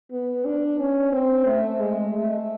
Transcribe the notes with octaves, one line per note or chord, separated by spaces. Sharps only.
B3
D4
C#4
C4
A3
G#3
A3